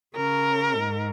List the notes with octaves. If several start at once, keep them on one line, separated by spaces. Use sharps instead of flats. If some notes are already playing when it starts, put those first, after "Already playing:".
C#3 A#4
G#2